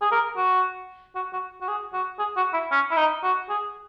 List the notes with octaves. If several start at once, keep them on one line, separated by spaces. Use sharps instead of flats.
G#4
A#4
F#4
F#4
F#4
F#4
G#4
F#4
G#4
F#4
E4
C#4
E4
D#4
F#4
G#4